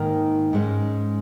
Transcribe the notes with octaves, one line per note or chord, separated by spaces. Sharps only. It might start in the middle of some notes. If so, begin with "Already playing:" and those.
Already playing: G#2 D#3 A#3 A#4
G#2 G#3 C#4